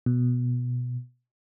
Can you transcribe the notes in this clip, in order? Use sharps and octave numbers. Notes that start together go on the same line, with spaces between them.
B2